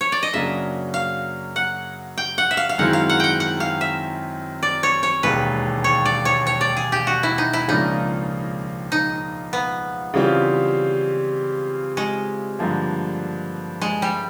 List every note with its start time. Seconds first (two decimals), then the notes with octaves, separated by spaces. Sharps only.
0.01 C#5
0.12 D5
0.23 D#5
0.33 F#2 C#3 F#3 A#3 D4 E5
0.94 F5
1.56 F#5
2.18 G5
2.38 F#5
2.51 E5
2.57 F5
2.69 F5
2.78 F#2 D#3 G#3 C4 E4 F#5
2.93 F5
3.09 F#5
3.20 F#5 G5
3.40 F#5
3.60 F5
3.81 E5
4.63 D5
4.83 C#5
5.03 C#5
5.23 E1 D#2 D#3 G#3 B4
5.84 C#5
6.05 D5
6.25 C#5
6.47 C#5
6.61 D5
6.77 G#4
6.92 G4
7.07 F#4
7.23 E4
7.38 D#4
7.53 E4
7.68 C#2 C#3 F3 A#3 D4 D#4
8.92 D#4
9.53 B3
10.14 C#3 E3 G3 C4 F4
11.97 G#3
12.59 G2 D3 F3 A#3
13.81 G#3
14.02 G3